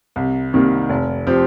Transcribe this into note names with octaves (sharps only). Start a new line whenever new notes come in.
C2
C3 D#3 G3 A#3
F1
F3 C4 G4